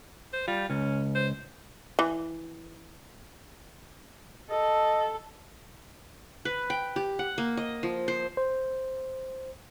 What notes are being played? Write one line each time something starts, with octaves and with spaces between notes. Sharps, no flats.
C5
G3 F4
C#2 C#4
C5
E3
A4 D#5
B4
G5
G4
F#5
A#3
D#5
F3
C5
C5